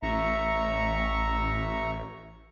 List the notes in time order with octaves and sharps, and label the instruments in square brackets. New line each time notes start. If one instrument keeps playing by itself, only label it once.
[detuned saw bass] A1 [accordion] E5 A#5 C#6